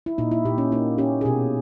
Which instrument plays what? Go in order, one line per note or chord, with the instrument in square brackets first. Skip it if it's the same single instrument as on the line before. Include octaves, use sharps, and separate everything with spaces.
[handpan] E4
A#2 D#4
E4
A#2 G4
C#4
A#3 D#4
C#4 G4
G#4
B2 G4